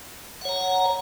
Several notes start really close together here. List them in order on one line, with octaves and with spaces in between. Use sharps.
F#5 C#5 A#5